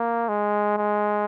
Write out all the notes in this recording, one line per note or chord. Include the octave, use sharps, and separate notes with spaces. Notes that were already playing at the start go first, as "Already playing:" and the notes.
Already playing: A#3
G#3
G#3